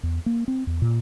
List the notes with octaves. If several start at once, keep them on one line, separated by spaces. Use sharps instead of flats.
E2
A#3
C4
E2
A#2